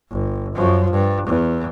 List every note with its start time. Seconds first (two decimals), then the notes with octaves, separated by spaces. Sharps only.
0.10 G1
0.55 F#2 F3
0.91 G2
1.27 E2